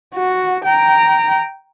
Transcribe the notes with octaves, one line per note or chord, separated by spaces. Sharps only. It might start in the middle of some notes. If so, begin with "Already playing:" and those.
F#4
G5 A#5